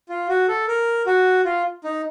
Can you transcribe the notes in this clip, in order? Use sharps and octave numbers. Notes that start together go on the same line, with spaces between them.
F4
F#4
A4
A#4
F#4
F4
D#4